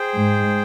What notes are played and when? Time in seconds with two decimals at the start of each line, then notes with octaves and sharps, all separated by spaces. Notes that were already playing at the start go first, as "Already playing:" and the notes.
Already playing: G#4 C5 G5
0.17 G#2